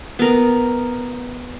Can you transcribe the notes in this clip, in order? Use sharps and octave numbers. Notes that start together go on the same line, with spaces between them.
B3 A#4